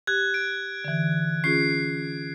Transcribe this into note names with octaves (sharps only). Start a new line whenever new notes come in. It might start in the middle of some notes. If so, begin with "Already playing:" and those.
G4 F#6 G#6
D7
D3 E3
C#4 F4 G#4 C7